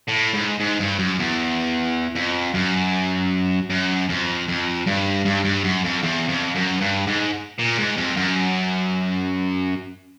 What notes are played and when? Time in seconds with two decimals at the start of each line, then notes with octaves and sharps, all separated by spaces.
0.08 A2
0.34 G#2
0.60 G#2
0.80 G2
0.99 F#2
1.19 E2
2.15 F2
2.54 F#2
3.70 F#2
4.09 F2
4.48 F2
4.87 G2
5.25 G2
5.45 G2
5.64 F#2
5.85 F2
6.03 E2
6.29 F2
6.55 F#2
6.81 G2
7.07 G#2
7.59 A#2
7.78 G#2
7.97 F2
8.17 F#2